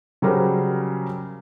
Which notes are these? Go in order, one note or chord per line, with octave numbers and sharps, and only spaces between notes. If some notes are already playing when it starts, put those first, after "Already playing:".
C#3 F#3 G3 A#4 C5